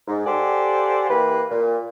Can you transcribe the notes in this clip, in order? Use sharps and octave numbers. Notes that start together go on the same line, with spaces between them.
G#2
G4 A4 C5 D5 F#5 G#5
E3 A#3 G4 B4
A#2